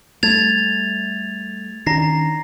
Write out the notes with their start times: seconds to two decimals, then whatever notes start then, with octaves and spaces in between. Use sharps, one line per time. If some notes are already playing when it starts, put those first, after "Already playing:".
0.23 G3 A3 G#6 A6 F7
1.86 D#3 C#4 D4 A#5 A#6 C7